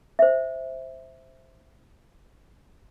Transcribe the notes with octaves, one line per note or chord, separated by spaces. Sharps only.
C5 E5